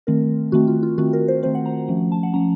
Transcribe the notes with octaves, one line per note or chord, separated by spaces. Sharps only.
D#3 A3 C4 A#4
D#3 A3 C4 F#4
F4
F4
D#3 A3 C4 F#4
A#4
C5
D#3 A3 C4 C5
F#5
A#5
F3 A3 C#4
A5
F#5
F3 A3 C#4 A#5